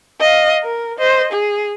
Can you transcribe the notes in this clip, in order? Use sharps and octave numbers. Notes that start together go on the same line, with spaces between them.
D#5 F5
A#4
C5 D#5
G#4